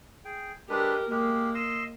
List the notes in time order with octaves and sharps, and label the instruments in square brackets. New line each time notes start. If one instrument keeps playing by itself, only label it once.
[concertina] G#4 G5
[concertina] G#3 D4 B4 [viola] G4 A#4
[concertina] G#3 G4 [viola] A#3
[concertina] D#5 C6 E6